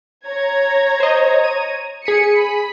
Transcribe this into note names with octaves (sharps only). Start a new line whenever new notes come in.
C#5 A#5 G#6
C5 D#5
D#7
G#4 B6 C#7 D#7
B5